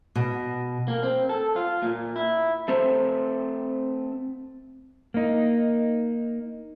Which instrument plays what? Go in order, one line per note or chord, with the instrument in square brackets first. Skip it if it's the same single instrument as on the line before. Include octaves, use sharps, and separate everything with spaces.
[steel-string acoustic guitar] B2
[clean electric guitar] A#3
C4
A4
F4
A#2
E4
[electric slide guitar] A3 C4 C5 E5
A#3 D#4